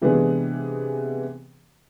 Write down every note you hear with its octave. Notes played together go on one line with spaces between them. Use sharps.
C3 E3 G#3 B3 D4 G#4